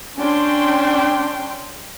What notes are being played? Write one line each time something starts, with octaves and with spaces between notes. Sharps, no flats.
C#4 D4 G5 C6